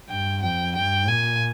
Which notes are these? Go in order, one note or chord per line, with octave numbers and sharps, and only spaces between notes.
G2 G5
F2 G5
G2 G5
A#2 G#5